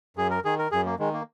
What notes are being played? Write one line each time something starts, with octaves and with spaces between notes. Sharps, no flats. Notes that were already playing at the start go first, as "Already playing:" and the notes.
F#2 G#4
A#4
D#3 G#4
A#4
F#2 G#4
A#3
D#3 G#3
A#3